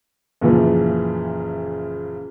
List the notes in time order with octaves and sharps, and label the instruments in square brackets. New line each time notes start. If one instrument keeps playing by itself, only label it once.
[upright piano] F#1 A#2 C#3 E3 F3